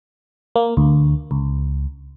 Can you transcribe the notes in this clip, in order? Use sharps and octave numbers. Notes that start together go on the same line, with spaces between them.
A#3
D2
C#2